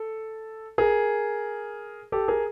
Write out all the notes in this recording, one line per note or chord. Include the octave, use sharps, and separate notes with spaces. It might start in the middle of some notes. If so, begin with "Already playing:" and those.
Already playing: A4
G#4 A#4
G4 A4
G#4 A#4